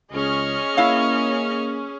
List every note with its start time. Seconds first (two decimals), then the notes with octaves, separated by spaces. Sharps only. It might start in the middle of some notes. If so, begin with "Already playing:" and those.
0.12 C#2 C#4 G#4 D#5 C#6 F6
0.77 A#3 E4 C#5 F5